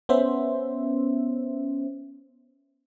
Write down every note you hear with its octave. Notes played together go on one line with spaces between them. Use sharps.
B3 C#4 C5 E5